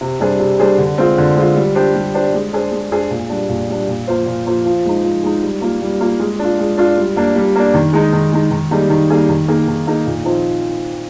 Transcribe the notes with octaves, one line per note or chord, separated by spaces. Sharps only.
C3
G3 D4 G#4 C5
C3
G3 D4 G#4 C5
D3
G#3 C4 F4
D3
G#3 C4 F4
G3
D4 G4 C5
G3
D4 G4 C5
G#3
D4 G#4 C5
G#3
D4 G#4 C5
A#2
G3 D4
A#2
G3 D4
A#2
F3 A#3 F4 C5
A#2
F3 A#3 F4 C5
F3
G#3 D#4
F3
G#3 D#4
G3
A#3 F4
G3
A#3 F4
G#3
D4 F4
G#3
D4 F4
G3
A#3 D4
G3
A#3 D4
D#3
G#3 D#4
D#3
G#3 D#4
D#3
G3 A#3 D#4 G#4
D#3
G3 A#3 D#4 G#4
D#3
A#3 D#4 G#4
D#3
A#3 D#4 G#4
A#2
F3 C4 D#4